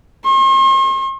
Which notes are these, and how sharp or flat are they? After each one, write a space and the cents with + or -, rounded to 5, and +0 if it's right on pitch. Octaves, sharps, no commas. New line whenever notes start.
C6 +45